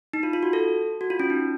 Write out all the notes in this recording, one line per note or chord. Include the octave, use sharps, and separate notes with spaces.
D#4
F4
F4
F#4
A4
F#4
F4
C#4
D#4